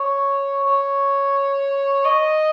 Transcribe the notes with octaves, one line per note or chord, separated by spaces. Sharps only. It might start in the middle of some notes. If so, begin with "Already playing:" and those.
Already playing: C#5
C#5
D#5